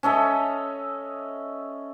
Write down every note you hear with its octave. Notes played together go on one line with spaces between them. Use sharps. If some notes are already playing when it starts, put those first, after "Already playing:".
C#4 A4 D#5 E5